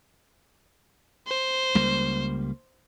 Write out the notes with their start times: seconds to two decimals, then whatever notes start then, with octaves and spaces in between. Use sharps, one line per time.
1.27 C5
1.75 C#2 G3 A#3